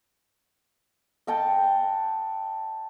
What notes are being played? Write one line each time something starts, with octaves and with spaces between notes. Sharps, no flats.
D#5 F#5 G5 A5